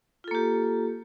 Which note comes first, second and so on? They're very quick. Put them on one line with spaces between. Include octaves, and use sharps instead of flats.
F4 A4 A#3 G4